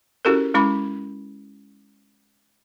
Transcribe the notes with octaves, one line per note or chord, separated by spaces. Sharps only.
C#4 E4 F#4 G4 A4 A#4
G#3 C#4 E4 B5 D6